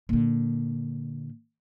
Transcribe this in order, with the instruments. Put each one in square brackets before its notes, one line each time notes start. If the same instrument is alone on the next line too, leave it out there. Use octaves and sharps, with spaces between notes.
[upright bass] A#2 D3